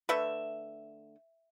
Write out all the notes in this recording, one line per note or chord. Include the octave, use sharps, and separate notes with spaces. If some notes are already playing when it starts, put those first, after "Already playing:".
D3 A3 B4 E5